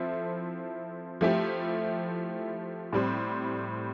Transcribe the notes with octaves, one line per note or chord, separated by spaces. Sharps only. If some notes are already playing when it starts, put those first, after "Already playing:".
Already playing: F3 C4 E4 A4
F3 A3 E4 G4
A2 G3 C4